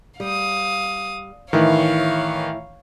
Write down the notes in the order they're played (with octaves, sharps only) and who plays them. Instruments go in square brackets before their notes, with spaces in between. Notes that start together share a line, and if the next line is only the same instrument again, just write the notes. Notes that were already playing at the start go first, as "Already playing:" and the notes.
[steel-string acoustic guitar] G3 [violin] F5 D#6
[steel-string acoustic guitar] A2 E4 [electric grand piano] D#3 E3 [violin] C#5 F5